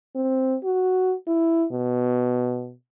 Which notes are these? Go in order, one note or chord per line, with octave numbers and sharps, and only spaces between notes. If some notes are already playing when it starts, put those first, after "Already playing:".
C4
F#4
E4
B2